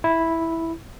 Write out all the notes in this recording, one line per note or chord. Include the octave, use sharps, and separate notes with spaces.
E4